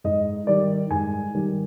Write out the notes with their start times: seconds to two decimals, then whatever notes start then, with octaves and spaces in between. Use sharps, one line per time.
0.04 G#2 D#5
0.47 D#3 G3 D5
0.91 G#2 G#5
1.35 D#3 G3